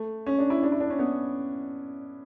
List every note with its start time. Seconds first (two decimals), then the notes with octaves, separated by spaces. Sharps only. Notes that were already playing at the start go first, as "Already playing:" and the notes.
Already playing: A3
0.27 C#4
0.39 D4
0.50 E4
0.63 D4
0.72 E4
0.80 D4
0.90 C#4
0.99 B3